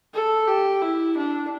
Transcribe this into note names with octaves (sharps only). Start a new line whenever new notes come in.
A4
G4
E4
D4